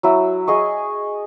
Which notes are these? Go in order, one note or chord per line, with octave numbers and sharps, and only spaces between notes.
F#3 E4
G#4 D#5 C#6